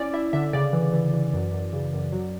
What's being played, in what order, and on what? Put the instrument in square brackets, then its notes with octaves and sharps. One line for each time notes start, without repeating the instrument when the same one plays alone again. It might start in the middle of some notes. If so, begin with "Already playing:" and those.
Already playing: [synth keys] C#4 E4 D5
E4 E5
D3 E5
C#3 D5
E3
E3
E3
F#2
F#2
C#3
F#2
F#3